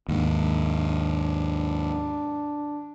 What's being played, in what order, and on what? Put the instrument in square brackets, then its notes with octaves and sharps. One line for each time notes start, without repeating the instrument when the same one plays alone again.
[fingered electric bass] D#2 G#2 [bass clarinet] D4